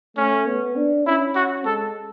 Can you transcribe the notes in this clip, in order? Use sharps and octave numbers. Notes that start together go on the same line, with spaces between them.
A3 C#4
B3
D4
C#4 E4
F#4
G#3 A4